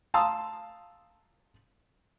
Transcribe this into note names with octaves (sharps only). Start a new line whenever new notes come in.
F5 A5 A#5 C6 D#6 E6